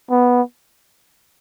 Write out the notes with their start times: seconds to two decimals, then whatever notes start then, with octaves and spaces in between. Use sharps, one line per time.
0.10 B3